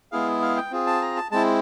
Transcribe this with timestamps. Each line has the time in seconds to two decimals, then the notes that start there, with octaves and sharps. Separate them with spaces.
0.12 G#3 B3 E4 G#4 F5
0.42 F5
0.56 G5
0.71 C4 F4 G#4
0.87 A5
1.02 A#5
1.16 A5
1.31 G#3 C4 E4 A5